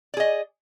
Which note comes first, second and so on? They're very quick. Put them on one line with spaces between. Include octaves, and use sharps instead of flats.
D5 G#4 D#5